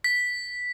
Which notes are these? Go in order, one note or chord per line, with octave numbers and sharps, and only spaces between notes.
B6